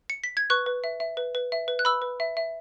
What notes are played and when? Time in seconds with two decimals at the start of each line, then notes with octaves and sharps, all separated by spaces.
0.10 C#7
0.24 B6
0.37 G#6
0.50 B4 C#6 F#6
0.66 B4
0.84 E5
1.00 E5
1.17 B4
1.35 B4
1.52 E5
1.68 B4
1.79 F#6
1.85 B4 B5 E6
2.02 B4
2.20 E5
2.37 E5